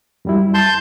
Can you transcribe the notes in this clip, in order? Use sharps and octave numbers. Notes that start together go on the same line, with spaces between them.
F#2 G3 E4
A5 C6 G6